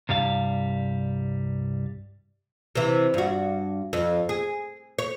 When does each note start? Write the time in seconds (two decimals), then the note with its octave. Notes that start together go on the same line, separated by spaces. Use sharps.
0.09 C2 G2 G3 F5
2.75 C3 E3
3.14 G2 F#4
3.93 F2
4.29 G#4
4.99 C#5